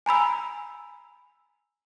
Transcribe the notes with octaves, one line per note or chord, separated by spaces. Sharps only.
G#5 A#5 B5 E6